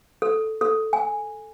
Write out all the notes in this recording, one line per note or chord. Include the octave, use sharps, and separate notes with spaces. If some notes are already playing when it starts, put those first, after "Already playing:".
A4
A4
G#5